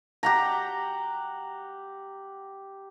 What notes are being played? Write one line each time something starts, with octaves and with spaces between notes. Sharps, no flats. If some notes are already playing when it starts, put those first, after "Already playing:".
G4 F#5 A#5